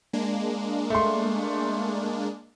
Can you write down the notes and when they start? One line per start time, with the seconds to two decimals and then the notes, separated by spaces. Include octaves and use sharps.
0.13 G#3 A#3 D4
0.90 A3 C6